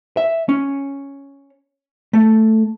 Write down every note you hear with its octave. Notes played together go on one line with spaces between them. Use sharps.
E5
C#4
A3